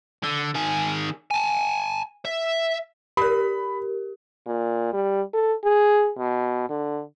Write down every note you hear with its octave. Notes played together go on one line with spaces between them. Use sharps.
D3
D#3 G#4
G#5 A5
E5
G4 A#4 B5
A#2
G3
A4
G#4
B2
D3